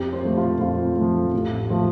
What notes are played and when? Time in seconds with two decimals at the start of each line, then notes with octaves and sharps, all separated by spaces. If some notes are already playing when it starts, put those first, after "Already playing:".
Already playing: F2 G4
0.13 C5
0.24 F3 A3
0.37 F4
0.61 F2 F4
0.97 F3 A3
1.34 A1
1.70 F3 A3